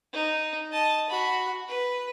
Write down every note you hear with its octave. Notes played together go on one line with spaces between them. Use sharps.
D#4
D#5 A5
F#4 B5
B4